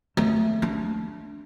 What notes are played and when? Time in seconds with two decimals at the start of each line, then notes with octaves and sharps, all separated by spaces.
0.17 A3
0.62 D4